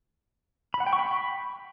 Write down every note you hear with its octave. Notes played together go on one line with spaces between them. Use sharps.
B5
F#5
G5
C#6
B5